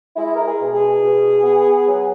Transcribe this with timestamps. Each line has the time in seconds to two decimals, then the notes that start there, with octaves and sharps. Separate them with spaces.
0.16 G#3 E4
0.35 A#4
0.45 G#4
0.59 B2
0.73 G#4
1.02 B2
1.44 B3
1.86 F#3